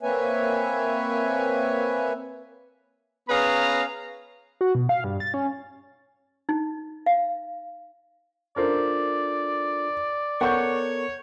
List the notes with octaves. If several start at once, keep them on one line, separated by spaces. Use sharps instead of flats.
A#3 C4 B4 C#5 E5 G#5
B3 C#4 G#4 B4 F5 A#5
F#4
B2
F5
G2
A6
C#4
D#4
F5
D4 F4 A4 A#4 C5 D5
B3 A4 A#4 C#5 F#5 C#6 G6